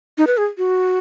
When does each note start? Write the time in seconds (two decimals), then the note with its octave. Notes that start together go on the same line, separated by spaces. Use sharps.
0.18 D#4
0.27 B4
0.37 G#4
0.58 F#4